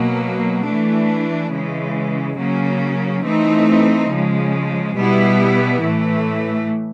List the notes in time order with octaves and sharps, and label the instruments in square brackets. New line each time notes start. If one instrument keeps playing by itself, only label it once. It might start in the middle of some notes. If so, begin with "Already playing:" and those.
Already playing: [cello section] B2 F#3 A#3
E3 A3 D4
C#3 E3 G#3
C#3 F#3 A#3 C#4
E3 A3 C4 D#4
C#3 F3 G#3
B2 G3 B3 E4
A2 E3 A3